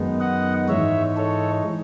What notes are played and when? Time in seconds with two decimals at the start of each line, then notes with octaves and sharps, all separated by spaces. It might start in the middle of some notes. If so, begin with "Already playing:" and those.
Already playing: F#2 D#3 G#3 B3 D#4
0.20 D#5 F#5
0.68 G#2 E3 G#3 D#4 C#5 E5
1.16 A4 C#5